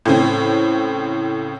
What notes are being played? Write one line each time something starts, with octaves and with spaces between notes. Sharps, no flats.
A2 C#3 C4